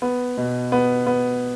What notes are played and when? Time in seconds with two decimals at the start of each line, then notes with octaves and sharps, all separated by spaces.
0.02 B3
0.37 B2
0.72 B3
1.07 B3